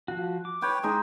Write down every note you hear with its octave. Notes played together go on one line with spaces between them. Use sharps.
F3 F#4
D6
B4 C#5 G5
G#3 D#4 G#4